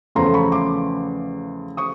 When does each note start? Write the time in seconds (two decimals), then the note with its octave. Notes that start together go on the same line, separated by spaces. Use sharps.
0.15 E2 C#3 F3 A3 A#5 C6
0.34 B5 C#6
0.52 C6 D6
1.77 C#6 D#6